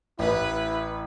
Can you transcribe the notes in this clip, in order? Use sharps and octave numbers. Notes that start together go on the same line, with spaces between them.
A1 E4 B4